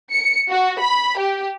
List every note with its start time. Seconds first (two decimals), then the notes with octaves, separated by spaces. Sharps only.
0.12 C#7
0.50 F#4
0.80 B5
1.18 G4